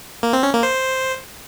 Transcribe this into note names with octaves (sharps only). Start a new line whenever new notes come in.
A#3
C4
C#4
A#3
C5